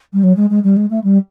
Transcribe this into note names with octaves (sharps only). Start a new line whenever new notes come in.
G3
F#3
G#3
G#3
G3
G#3
A3
G3